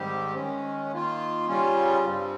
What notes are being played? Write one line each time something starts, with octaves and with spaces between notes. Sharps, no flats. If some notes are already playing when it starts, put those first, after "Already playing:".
Already playing: G#2 D#3 G3 C4 G4
D#3 G#3 C#4
D#3 A#3 F4
C#3 G3 C#4 F4
G2 G3 C4